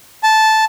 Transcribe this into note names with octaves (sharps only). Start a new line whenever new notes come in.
A5